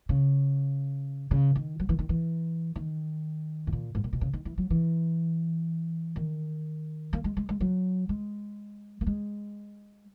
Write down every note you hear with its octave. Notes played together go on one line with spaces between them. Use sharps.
C#3
C#3
D#3
F#3
E3
D#3
E3
D#3
G#2
A#2
G#2
A#2
B2
C#3
D#3
E3
F#3
E3
D#3
A#3
G#3
G#3
G#3
F#3
G#3
A#3
G#3